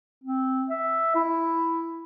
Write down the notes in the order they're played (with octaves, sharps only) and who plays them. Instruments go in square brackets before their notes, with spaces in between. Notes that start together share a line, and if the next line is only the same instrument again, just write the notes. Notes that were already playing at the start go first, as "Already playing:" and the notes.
[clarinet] C4
E5
E4